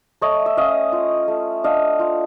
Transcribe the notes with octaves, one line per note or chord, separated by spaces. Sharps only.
A3 C#5 D#5
E5
C#4 D#5 F5
F4
A3
D4 D#5 F5
F4